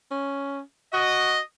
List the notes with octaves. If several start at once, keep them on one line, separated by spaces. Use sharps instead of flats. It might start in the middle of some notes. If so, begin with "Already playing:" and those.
C#4
F#4 D#5